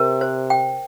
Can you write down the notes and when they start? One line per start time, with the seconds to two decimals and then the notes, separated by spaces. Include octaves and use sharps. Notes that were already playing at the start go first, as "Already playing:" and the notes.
Already playing: C3 A#4
0.21 C5
0.50 G5